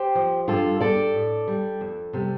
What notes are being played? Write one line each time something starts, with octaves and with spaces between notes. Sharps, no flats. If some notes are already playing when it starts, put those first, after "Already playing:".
Already playing: G4 C5
F3
G2 F4 A4
G3 A4 D5
A2
G3
F2
C3 G3